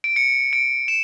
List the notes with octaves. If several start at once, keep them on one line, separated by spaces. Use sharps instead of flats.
D7
C#7
D7
E7